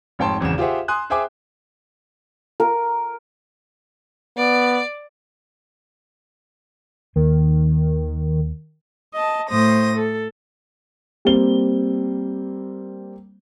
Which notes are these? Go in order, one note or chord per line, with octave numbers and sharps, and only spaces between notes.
F1 G#2 C#5 G5 A5 C6
G#1 E2 C#3 E7
F4 G4 G#4 C5 E5 F#5
G#5 C6 D#6 F#6
G#4 C5 E5 G5 G#5 D6
A#4
B3 D5
D#2 D#3 A#3
D#5 A5
A2 C5 D#6 A#6
A4
G3 A#3 C4 G7